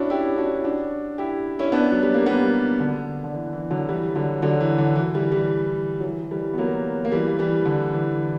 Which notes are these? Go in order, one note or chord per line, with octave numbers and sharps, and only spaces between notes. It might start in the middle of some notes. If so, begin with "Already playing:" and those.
Already playing: C#4 D4 E4 F#4
E4 G4
D4 F#4
E4
D4 F#4
E4 G4
C#4 E4
B3 D4
F#3
G3
A#3
G3 B3
D3
D3
E3
E3
D3 F#3
E3 G3
D3 F#3
D3 F#3
E3
D3
E3
E3 G3
E3 G3
F#3
E3
E3 G3
B3
F#3 A#3
A#3
E3 G3
E3 G3
D3
E3